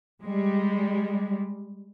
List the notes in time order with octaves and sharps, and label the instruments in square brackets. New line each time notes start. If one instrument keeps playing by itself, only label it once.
[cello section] G3 G#3